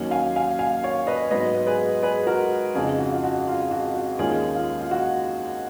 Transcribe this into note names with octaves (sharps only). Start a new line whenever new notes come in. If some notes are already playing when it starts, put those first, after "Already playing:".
Already playing: D#2 D#3 F#3 C#4
F5 G#5
F5 G#5
F5 G#5
C#5 F5
B4 D#5
G#2 F#3 B3 D#4 B4 D#5
G#4 B4
G#4 B4
F#4 A#4
F2 C#3 G#3 D#4 F4 G#4
F#4
F4
F#4
F4
F#4
F#4
D#2 D#3 G#3 C#4 F4 G#4
F4
F4
F#4